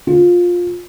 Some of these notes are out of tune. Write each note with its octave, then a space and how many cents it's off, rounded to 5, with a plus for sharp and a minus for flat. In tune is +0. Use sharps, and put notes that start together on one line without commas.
F4 +15